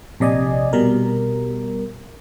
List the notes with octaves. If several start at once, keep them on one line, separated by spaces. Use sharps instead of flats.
A#1 C3 D5 D#5 G#5
B2 G3 A#4